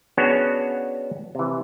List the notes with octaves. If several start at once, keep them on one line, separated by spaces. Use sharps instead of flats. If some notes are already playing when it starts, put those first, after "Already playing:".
B3 C#4 D4 F#4 G#4 C#5
C3 E3